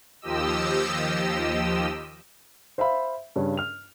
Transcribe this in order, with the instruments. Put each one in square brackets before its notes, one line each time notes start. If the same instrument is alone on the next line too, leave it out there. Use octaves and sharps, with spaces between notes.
[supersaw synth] D#2 F3 G4 D#5 E6
[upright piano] C5 E5 F5 B5
G2 C#3 C#4
F6 F7